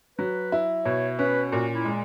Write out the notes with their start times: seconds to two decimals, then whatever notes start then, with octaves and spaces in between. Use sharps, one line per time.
0.18 F#3 B4
0.52 E4
0.85 B2 C#5
1.19 C#4 B4
1.51 A#2 F#4
1.74 E4
1.85 G#3